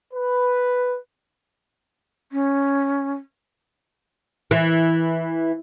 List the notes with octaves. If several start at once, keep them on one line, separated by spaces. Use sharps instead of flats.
B4
C#4
E3